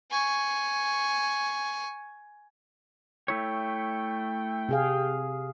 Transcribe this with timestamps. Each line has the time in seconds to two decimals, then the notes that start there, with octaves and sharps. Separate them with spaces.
0.11 G#5 C#6
3.28 A3 E4 C#5 G5
4.69 C3 G#4 F5